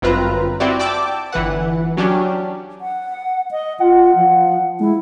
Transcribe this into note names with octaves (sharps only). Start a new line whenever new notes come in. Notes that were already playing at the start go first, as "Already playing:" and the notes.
G1 F#2 C4 F4 B4 A#5
C4 E4 F#4 G4 D5
D5 G5 A5 D6 E6
G1 E3 B4 F#5
F#3 C#4 D4 G4
F#5
D#5
F4 F#5
F3
G#3 E4